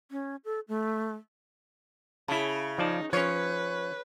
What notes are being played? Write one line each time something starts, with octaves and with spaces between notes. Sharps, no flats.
C#4
A4
A3
C#3 E4 A5
F3 D#4 D5 A5
F3 C#4 B4 C#5